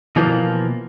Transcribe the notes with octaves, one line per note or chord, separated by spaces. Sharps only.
B2 E3 F3 A#3